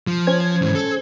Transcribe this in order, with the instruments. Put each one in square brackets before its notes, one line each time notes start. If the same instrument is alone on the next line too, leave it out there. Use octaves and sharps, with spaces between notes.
[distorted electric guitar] F3
[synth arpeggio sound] C#4 C5 G#6
[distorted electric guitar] G#2 E3
A4